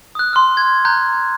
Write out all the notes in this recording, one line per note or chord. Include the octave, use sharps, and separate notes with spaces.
D#6 F#6
C6 F6
G#6
A#5 F#6 G6